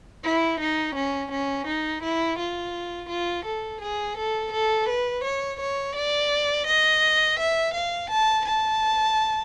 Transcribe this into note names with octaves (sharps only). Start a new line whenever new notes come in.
E4
D#4
C#4
C#4
D#4
E4
F4
F4
A4
G#4
A4
A4
B4
C#5
C#5
D5
D#5
E5
F5
A5
A5